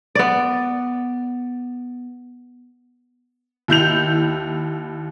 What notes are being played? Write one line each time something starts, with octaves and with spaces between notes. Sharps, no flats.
B3 D5
D#2 E4 G6 F7